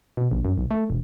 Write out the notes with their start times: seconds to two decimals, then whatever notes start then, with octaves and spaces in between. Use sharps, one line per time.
0.17 B2
0.31 A#1
0.45 F#2
0.58 B1
0.71 A3
0.90 E1